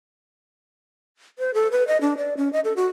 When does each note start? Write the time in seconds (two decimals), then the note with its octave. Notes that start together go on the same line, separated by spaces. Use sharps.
1.39 C5
1.54 A4
1.72 B4
1.87 D#5
2.01 D4
2.17 D5
2.37 C#4
2.53 D#5
2.64 A4
2.76 F#4